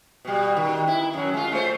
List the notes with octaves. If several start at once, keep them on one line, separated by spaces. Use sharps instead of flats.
B2 G3
D#3
E4
F#2 F#3
G#3 F4
A3 C5